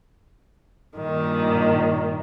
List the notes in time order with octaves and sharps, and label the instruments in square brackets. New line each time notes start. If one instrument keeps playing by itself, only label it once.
[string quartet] G2 A#2 D#3